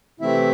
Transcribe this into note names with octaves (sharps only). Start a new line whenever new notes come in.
C3 E3 A3 C4 E4 E5